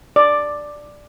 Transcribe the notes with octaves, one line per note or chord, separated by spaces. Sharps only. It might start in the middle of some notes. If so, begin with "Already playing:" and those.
D5